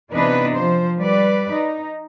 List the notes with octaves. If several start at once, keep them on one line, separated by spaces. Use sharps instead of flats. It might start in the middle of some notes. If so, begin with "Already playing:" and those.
C3 E3 B3 D4 D#4 B4
F3 C5
G3 B4 D5
D#4